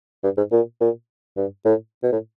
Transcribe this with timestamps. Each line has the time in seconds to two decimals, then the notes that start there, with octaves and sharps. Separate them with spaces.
0.24 G2
0.37 G#2
0.52 A#2
0.81 A#2
1.37 G2
1.65 A2
2.03 B2
2.12 A2